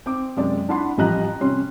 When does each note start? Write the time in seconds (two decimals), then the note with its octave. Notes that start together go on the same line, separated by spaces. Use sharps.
0.06 C4 D6
0.37 F#2 C3 G#3 D5
0.69 D4 E4 F#5 B5 C6
0.97 A1 F3 G3 D#5 A#5 F#6
1.41 C3 G3 C#4 C6